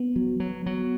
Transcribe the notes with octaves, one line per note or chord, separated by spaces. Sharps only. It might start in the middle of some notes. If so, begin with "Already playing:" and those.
Already playing: B3
F#3
F#3
F#3